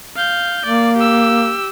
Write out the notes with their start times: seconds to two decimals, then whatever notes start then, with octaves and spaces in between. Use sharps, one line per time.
0.16 F5 G6
0.66 A#3 D5
0.97 G4 E6